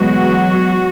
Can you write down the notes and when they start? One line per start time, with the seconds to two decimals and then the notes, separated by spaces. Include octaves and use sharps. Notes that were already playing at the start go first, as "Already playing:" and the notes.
Already playing: E2 B2 F#3 G#3 B3 F#4